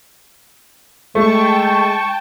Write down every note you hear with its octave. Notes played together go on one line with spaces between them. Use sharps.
G#3 A3 G5 A5 C#6